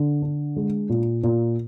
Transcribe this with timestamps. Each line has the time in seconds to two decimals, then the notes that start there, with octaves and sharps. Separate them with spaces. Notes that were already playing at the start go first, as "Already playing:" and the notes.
Already playing: D3
0.22 D4
0.56 G#3
0.89 A#2
1.23 A#2